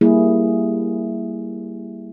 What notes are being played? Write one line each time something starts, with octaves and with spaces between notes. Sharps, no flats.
G3 A#3 E4 G#4